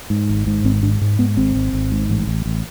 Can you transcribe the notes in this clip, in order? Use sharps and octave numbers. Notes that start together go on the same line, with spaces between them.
G#2
G#1
G#2
G#1 C4
G#2 D4
G#2
G#2 B3
G#1 C4
G#1
G#1
G#2
A1
A1
A1